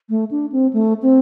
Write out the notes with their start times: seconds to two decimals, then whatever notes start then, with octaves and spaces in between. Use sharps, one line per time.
0.09 A3
0.31 D4
0.52 C4
0.73 A3
1.02 C4